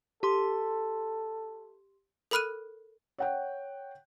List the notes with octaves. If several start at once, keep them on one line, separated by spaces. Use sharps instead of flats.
G4 A4 C6
A4 A#4 B5 F6 F#6 D#7
C#5 F#5 G5